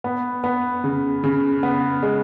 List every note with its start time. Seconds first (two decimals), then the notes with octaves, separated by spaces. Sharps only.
0.04 B3
0.44 B3
0.84 C#3
1.24 C#3
1.63 B3
2.03 G#3